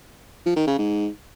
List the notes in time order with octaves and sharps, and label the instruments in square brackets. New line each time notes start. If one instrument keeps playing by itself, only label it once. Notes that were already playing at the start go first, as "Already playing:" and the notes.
[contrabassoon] F3
D#3
C#3
G#2